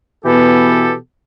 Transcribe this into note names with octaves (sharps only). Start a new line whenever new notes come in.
B2 E3 B3 G4 A4